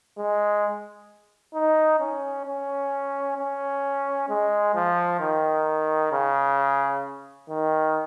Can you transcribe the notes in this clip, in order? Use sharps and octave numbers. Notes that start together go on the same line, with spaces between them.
G#3
D#4
C#4
C#4
C#4
G#3
F3
D#3
C#3
D#3